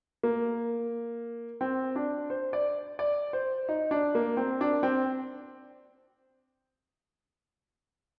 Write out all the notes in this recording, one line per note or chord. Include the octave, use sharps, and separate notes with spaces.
A#3
C4
D4
C5
D5
D5
C5
D#4
D4
A#3
C4
D4
C4